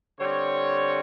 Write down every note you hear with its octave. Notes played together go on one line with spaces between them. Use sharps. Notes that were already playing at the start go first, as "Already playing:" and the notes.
D3 G3 C4 C#5